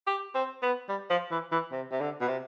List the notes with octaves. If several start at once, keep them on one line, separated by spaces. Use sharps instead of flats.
G4
C4
B3
G3
F3
E3
E3
C3
C3
D3
B2
C3